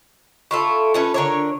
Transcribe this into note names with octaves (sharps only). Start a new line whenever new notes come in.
E4 F4 A4 C#6 E6
A3 C#4 F4 B4
D3 A#4 C#5